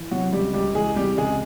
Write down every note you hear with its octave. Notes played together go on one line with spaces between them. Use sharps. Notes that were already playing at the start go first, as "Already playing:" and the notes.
Already playing: E3
C3 F#3 F#4
C#2 G3 G4
C#2 G3 G4
E3 G#3 G#4
C3 G3 G4
C#2 G#3 G#4